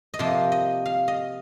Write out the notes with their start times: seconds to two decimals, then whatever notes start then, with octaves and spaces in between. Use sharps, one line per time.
0.14 D#5
0.19 C3 F3 A#3 C5
0.52 D#5
0.86 F5
1.08 D#5